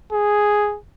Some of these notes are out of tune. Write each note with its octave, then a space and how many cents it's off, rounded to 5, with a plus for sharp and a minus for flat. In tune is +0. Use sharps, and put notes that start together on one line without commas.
G#4 +0